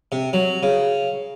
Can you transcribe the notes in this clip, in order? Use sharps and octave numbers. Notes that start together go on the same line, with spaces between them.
C3
F#3
C#3